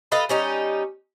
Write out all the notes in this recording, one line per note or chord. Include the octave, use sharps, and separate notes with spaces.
A4 B4 D#5 F5
G3 C#4 D#4